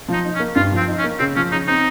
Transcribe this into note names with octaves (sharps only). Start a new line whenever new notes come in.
F3 D#4
D#4
C#4
A#3
G2 F4
F3
C4
D#4
C#4
A#3
C#3 C4
F3 C#4
C#3 D#4
C4 D#4